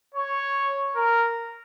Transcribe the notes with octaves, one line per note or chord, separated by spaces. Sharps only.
C#5
A#4